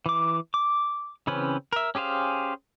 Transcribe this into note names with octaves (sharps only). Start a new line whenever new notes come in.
E3 D6
D6
C#3 E3 C4 C#4 B4
A#4 E5
C#4 G4 G#4 C5 F5